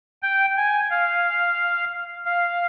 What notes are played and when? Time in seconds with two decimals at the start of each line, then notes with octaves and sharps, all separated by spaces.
0.23 G5
0.57 G#5
0.90 F5
2.25 F5